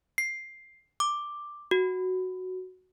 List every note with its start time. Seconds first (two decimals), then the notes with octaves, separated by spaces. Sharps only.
0.18 C7
1.00 D6
1.71 F#4